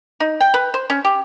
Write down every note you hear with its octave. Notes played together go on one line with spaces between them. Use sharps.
D#4
G5
B4
C5
C#4
G4